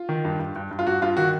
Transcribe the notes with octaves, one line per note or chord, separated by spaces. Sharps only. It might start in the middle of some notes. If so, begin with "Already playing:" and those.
Already playing: F4
D#3
G2
G2
G2
G2
F4
G2 F#4
G2 F4
D#3 F#4